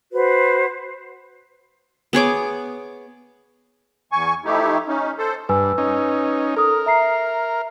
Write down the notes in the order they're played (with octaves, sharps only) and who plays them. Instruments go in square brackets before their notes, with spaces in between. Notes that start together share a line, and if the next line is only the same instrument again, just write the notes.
[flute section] F#4 B4 C5
[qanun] B3 G#4 C#5 D6
[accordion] E2 G#5 C#6
F3 A3 D#4 E4 G4
C#4 D#4
A4 C5
[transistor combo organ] G2 [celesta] B4 G#5 E6
[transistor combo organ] C#4 D#4
[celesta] A4 D#6 [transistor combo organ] A#4
[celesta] E5 A#5 C7